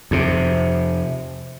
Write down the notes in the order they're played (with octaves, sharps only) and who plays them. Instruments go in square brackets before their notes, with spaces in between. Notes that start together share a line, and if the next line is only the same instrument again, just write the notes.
[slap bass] F2 C3